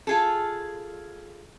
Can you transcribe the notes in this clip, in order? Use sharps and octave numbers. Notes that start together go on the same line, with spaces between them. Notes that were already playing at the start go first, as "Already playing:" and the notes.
F4 G#4 A4